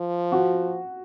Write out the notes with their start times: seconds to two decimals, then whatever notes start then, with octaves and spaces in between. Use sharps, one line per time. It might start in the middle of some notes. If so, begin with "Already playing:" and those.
Already playing: F3
0.32 F#4